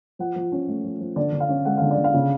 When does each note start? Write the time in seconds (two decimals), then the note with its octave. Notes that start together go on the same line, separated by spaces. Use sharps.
0.19 F3 F#5
0.36 F3
0.52 C#4
0.68 A3
0.84 F3
1.00 F3
1.16 D3 D5
1.32 D3
1.40 F5
1.49 C#4
1.65 G#3 F#5
1.78 D3 F5
1.91 D5
1.98 D3
2.04 F5
2.14 C#3